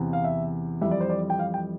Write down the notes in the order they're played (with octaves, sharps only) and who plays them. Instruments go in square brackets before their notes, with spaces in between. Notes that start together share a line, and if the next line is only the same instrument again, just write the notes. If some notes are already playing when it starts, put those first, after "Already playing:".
Already playing: [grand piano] E2 C3 E3
F5
E5
F2 E3 G3 E5
D5
C5
D5
G5
F5
G5